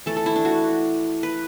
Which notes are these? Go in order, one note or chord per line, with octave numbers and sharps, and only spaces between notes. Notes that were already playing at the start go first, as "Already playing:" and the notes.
E3 A3 A4
A4
E4
D4
F#4
B4